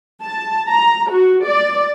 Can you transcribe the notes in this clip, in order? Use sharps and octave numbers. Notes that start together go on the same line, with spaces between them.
A5
A#5
F#4
D5